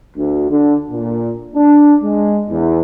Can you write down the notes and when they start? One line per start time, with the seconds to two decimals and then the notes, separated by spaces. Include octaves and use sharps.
0.17 D2
0.50 D3
0.91 A#2
1.55 D4
2.02 G#3
2.50 E2